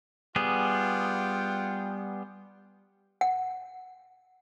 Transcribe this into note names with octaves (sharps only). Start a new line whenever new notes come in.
G3 B3 F4 G#4 F#5 G5
F#5